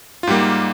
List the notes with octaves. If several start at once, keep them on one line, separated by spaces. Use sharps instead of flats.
F4
G#2 G3 A#3 G4